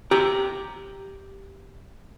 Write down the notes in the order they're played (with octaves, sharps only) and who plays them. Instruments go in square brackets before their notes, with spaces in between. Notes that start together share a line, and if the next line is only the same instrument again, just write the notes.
[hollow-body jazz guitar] G4 A#5